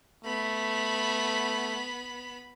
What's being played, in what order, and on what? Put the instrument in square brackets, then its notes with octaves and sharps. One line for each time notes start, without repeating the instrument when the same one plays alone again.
[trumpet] A3 [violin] B3 B5